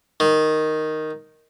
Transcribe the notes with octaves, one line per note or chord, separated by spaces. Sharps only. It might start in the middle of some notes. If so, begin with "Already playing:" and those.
D#3